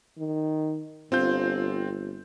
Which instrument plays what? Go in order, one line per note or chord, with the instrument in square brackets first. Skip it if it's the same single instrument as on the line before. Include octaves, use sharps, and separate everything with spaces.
[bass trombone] D#3
[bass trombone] G1 [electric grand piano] C4 F4 G6